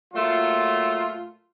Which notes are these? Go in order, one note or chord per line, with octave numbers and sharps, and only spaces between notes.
A#2 F#3 A3 F4